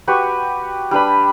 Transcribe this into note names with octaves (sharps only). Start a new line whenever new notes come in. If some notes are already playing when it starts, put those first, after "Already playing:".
F#4 G4 B4 C#6
G3 D4 B4 B5